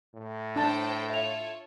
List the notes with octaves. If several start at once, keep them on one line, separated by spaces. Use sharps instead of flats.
A2
D4 A4 C5 G5 A5
F4 A4 C#5 E5 F7